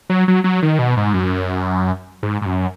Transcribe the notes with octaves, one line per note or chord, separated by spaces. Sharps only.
F#3
F#3
F#3
D#3
B2
G#2
F#2
G#2
G#2
F#2